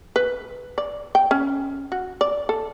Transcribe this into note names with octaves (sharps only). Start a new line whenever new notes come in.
B4
D5
G5
C#4
F#4
D5
A4